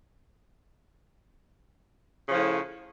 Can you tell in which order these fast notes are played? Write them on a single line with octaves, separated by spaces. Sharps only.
C#3 F3 A2